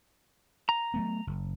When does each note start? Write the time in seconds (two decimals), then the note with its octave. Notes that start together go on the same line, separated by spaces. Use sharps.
0.69 A#5
0.94 F#3 A3 B3
1.27 F#1